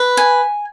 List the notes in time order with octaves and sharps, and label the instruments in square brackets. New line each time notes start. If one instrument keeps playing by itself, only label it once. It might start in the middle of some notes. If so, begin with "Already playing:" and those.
Already playing: [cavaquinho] B4
G#5